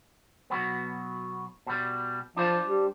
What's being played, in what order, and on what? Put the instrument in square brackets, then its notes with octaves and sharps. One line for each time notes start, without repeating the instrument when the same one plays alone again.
[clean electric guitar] B2 F#3 B3
B2 G3
[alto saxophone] F3 [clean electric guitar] D4 C5 A5
[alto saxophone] G3